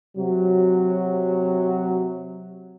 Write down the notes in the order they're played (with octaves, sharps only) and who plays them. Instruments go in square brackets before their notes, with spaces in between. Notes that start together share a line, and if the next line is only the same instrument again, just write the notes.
[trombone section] C3 F#3